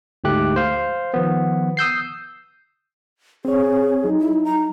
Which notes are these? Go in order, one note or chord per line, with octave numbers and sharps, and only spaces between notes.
D2 G#2 A3 G4 F#6
C5 F5
D#3 F3 B3
D#6 E6 G6 C7
C4 G#4 C#5
F#3 D#4
E4
A#5